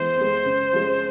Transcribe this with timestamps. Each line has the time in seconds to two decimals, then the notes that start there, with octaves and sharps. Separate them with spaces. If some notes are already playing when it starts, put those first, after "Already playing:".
Already playing: E3 G#3 B3 C5
0.17 G#3 B3
0.45 C#3
0.73 F3 G#3 C#4